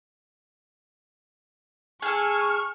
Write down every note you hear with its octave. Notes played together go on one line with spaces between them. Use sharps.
G#4 A4 G#5 C#6 F6